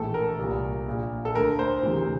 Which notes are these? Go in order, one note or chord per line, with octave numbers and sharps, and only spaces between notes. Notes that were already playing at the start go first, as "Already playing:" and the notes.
Already playing: A#1 A2 E3 A4
A#4
C2 A#2
A#1 A#2
A4
D2 D3 A#4
C5
E1 D2 C3 E3